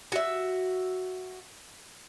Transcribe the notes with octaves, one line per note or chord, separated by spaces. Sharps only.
F#4 E5